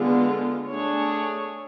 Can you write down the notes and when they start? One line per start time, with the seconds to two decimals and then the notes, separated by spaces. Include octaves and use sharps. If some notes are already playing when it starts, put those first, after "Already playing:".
Already playing: D3 G#3 B3 F4
0.69 A3 D4 G#4 C#5